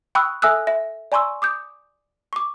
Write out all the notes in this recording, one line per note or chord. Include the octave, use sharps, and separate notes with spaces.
G5 B5 C#6 D#6 E6 F#6
A4 E5 G#5 D#6 E6 F#6
E5
D5 G#5 A#5 C6 C#6 E6
D6 D#6 G6
C#6 D6